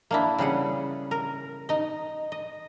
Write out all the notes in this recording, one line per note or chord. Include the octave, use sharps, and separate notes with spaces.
A#3 D4 E4
C#3 G3 G#4 F#5
A#4
D#4 D#5
D#5